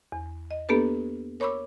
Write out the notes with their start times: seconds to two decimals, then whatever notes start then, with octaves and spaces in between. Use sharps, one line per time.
0.12 E2
0.51 D#5
0.69 A#3 B3 D4 G4 A4 B4
1.40 A#4 C#5 B5 C#6 D6 E6